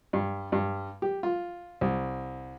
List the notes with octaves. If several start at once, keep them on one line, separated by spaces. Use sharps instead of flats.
G2
G2
G4
F4
C2